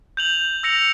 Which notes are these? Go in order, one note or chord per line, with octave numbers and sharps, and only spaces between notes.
G6 F7 F#7
E6 A#6 C#7 F7